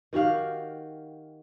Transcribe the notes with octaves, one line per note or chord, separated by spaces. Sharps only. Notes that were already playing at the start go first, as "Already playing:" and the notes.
D#3 F#4 G4 F5